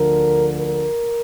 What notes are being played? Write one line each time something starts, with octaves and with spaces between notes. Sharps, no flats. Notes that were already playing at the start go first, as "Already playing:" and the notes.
Already playing: D2 D3 F3 A#4
A#4